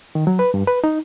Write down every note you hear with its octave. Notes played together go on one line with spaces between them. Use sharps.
D#3
F#3
B4
G2
B4
D#4